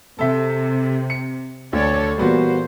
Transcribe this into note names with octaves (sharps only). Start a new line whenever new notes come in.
C3 A4 E5
C#7
D2 A4 C#5 D5
A#2 E3 G3 B3 F#4 C5